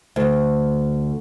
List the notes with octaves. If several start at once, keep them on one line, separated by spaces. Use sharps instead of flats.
D2